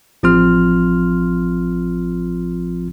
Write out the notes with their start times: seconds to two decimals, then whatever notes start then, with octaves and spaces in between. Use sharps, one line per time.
0.23 A1 F3 C4 F4 C6 F6